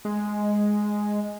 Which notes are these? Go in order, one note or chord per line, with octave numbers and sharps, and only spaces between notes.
G#3